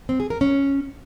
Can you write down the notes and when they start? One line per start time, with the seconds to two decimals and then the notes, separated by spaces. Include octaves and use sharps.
0.09 C4
0.20 G#4
0.30 A#4
0.41 C#4